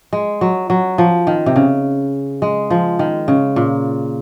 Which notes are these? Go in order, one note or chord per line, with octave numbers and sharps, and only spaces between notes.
G#3
F#3
F#3
F3
D#3
C3
C#3
G#3
F3
D#3
C#3
A#2